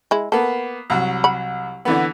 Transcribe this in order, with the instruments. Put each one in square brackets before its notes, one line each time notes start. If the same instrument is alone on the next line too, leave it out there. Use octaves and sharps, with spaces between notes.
[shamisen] G#3 E4
[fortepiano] A#3 B3 [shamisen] A4
[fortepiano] C2 F#3
[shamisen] F#5 B5
[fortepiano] D3 E3 B3